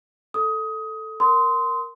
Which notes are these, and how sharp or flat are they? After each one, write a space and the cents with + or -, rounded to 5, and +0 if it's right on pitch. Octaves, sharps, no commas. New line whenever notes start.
A4 +0 D#6 +20
A#4 +0 C6 -15 D#6 +25